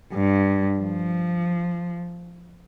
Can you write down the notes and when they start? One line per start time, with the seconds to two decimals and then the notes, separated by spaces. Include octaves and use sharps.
0.13 G2
0.79 F3